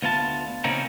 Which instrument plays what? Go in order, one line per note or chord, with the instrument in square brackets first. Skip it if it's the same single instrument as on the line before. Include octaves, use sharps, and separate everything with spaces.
[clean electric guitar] D2 B3 F4 A5
C#3 A#3 C4 C#4 D#4 E4